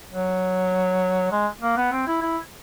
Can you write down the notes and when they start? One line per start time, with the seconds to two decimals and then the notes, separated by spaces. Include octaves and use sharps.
0.11 F#3
1.32 G#3
1.61 A#3
1.77 B3
1.92 C4
2.07 E4
2.22 E4